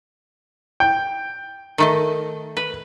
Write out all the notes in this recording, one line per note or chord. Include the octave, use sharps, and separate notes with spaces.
G5
D#3 A3 D#5
B4